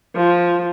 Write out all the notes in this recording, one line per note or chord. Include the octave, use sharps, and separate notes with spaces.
F3